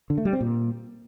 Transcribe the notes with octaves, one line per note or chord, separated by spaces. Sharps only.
D3
A3
G3
C4
A#2